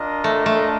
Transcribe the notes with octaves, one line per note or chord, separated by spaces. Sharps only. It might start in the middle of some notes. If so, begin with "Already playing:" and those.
Already playing: D4 F4 A#4 D#5
A3
A3